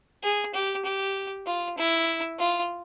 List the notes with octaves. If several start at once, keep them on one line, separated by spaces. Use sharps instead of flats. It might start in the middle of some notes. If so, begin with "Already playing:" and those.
G#4
G4
G4
F4
E4
F4